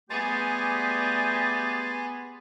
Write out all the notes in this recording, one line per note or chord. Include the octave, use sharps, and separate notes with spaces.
G3 A3 B3 G4 G#4 G#5 C6 A6